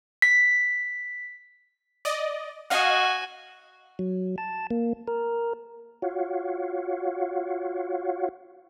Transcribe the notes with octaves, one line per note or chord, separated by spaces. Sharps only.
B6
D5 D#5
F#4 D#5 F5 F#5 G#5
F#3
A5
A#3
A#4
F4 F#4 C#5 F5 F#5